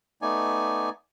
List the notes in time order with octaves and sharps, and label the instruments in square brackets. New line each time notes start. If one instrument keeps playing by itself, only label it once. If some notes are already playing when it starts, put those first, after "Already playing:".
[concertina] A3 B3 D#4 D5 G#5